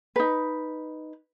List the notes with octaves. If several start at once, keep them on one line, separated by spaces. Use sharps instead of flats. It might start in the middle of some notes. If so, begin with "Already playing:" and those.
D#4 B4